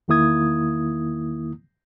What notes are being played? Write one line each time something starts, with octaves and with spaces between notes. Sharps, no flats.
E2 D#3 A#3 E4 D#6 G#6